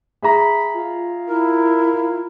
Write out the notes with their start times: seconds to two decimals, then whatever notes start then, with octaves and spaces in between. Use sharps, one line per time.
0.22 G#4 E5 A#5 B5
0.74 F4
1.28 E4 A#4